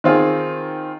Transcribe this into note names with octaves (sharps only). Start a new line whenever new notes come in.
D#3 C4 F4 G#4